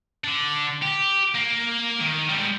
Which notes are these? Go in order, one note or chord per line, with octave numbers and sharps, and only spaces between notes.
D3 D4
G4
A#3
D#3
G3 G#3